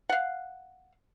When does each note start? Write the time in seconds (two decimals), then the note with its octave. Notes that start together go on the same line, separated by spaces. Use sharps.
0.09 F5 F#5